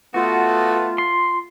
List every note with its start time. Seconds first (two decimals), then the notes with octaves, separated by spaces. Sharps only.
0.14 A3 B3 F4 F#4
0.98 C6